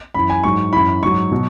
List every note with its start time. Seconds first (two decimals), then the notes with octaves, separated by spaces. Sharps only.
0.14 F#2 E3 B5
0.30 G#5
0.44 G#2 F#3 C#6
0.73 F#2 E3 B5
1.02 G#2 F#3 C#6
1.31 B2 F#3